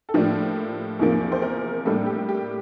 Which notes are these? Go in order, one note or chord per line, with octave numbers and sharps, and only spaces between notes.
A4
A2 F3 A#3 D4 G4
E2 C3 F3 A#3
C5
A#4
A2 G3 A#3 D4 A4
G4
G4